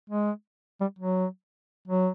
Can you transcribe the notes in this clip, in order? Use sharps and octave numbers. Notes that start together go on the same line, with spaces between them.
G#3
G3
F#3
F#3